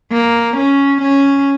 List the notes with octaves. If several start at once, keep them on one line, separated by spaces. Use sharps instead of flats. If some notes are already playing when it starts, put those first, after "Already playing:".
A#3
C#4
C#4